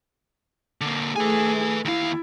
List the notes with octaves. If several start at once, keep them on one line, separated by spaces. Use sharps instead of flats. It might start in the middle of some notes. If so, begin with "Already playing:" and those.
D3 A#3
A3 G#4 B4 G#5
D#2 E4 F5